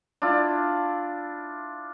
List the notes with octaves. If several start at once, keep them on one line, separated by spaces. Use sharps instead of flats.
D4 E4 F4